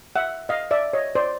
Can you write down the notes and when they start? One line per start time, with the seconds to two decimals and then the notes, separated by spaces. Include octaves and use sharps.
0.16 E5 F#5
0.49 D#5 F5
0.71 D5 E5
0.93 C#5 D#5
1.15 C5 D5